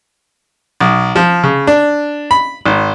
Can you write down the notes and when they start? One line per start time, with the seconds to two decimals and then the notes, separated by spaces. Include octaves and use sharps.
0.80 B1
1.16 F3
1.44 C#3
1.67 D4
2.31 B5
2.66 G#1